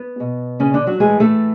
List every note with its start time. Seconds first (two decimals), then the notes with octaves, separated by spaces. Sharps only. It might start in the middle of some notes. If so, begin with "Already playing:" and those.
Already playing: B3
0.20 B2
0.60 C#3 C#4
0.74 D3 D4
0.87 F#3 F#4
1.00 A2 E3 G#3 G#4
1.20 A3 A4